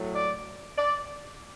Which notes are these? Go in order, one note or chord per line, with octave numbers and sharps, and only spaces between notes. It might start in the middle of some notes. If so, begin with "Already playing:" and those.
Already playing: A2 F#3 A3
D5
D5